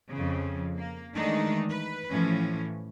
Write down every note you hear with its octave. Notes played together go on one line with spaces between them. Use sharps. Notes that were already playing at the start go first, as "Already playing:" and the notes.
F2 C#3
A#3
D#3 E3 G#3 A3 D4 D#4
B4
A2 E3 F3 C#4